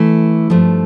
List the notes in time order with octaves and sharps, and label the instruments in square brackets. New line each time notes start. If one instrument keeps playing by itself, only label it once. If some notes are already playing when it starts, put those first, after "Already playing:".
Already playing: [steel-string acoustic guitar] E3 A3 E4
G2 F3 A3